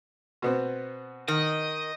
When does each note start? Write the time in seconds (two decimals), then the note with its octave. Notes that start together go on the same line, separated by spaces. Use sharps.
0.42 B2 B3 C4
1.28 D#3 D#5